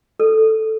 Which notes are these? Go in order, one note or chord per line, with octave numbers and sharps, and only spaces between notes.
A4